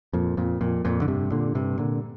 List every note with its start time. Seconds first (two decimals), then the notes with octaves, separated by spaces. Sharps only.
0.13 F2 A#2
0.37 F2 A#2
0.61 F2 A#2
0.85 F2 A#2
1.02 D3
1.08 G2 C3
1.32 A#2 D3
1.55 G2 C3
1.78 A#2 D3